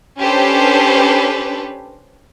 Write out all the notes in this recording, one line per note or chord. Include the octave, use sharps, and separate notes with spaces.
C#4 D4 G4 A4 B4 C5